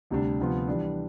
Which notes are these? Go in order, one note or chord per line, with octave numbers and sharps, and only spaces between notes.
D2 C3 G3 D4
D2 C3 F3 B3 F4
E3 G3 D4